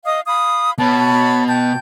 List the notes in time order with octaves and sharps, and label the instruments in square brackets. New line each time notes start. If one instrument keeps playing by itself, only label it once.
[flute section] D#5 F5 D#6
F5 B5 D#6
[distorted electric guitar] B2 [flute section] C#5 A5 B5
[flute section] G5 A5 G6